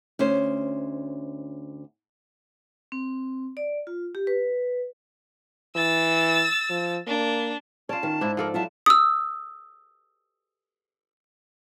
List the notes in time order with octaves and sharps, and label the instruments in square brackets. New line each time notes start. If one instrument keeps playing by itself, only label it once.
[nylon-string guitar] D2 C#4 C5
[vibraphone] C4
D5
F4
G4
B4
[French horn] E3 [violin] E6 A6
[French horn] F3
[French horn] A#3 [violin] D4
[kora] C#4 F4 [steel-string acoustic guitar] D5 [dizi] A5
[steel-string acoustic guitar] D#3
[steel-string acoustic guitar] G#2 [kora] D4 E4
[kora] F3 A4 D5 [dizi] A#4
[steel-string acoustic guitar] F#3 E4 F4 [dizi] A5
[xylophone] D#6 E6